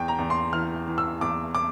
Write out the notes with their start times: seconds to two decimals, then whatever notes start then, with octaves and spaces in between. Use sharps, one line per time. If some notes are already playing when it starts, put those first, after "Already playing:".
Already playing: E2 G5
0.08 A#5
0.19 E2
0.30 C6
0.53 E3 F6
0.87 E3
0.98 E6
1.21 E2 D6
1.55 D6